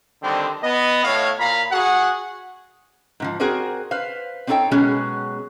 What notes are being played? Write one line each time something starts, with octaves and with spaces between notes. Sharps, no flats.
D3 D#3 G3 C4
B3 D#5
A2 C#5 F5
A#2 F5 A#5 B5
F#4 G#4 F#5
G#2 D#3 F3
C4 F#4 G#4 A#4 C5 D5
B4 C5 F5
C4 D4 D#4 A4 C#5 G5
B2 F#3 G#3 B3 C#4 G#4